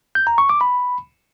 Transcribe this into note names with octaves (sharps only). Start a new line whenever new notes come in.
G6
A#5
C#6
D6
B5